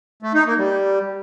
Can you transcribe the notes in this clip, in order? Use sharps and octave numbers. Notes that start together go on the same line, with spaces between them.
A3
D#4
A#3
G3